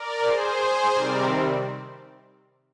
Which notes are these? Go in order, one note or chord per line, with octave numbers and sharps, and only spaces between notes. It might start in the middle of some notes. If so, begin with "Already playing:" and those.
Already playing: A#4 D5
G#4 C5
C3 D#3 G3 C4 A#4 D5